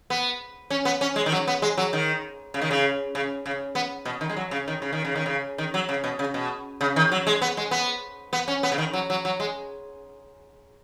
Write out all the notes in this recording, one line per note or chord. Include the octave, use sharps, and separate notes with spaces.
B3
C#4
B3
C#4
G#3
D#3
F#3
B3
G#3
F#3
D#3
C#3
D#3
C#3
C#3
C#3
B3
B2
D#3
G#3
F#3
C#3
D#3
C#3
D#3
C#3
D#3
C#3
D#3
F#3
C#3
B2
C#3
B2
C#3
D#3
F#3
G#3
B3
G#3
B3
B3
C#4
B3
C#3
D#3
F#3
F#3
F#3
G#3